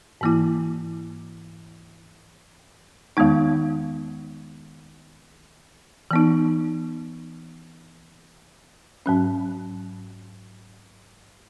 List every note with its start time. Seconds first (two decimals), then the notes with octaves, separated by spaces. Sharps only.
0.21 G#2 E3 A#3 E4
3.17 E2 D#3 G#3 B3 D#4
6.11 E3 B3 D#4
9.06 G#2 F#3 C#4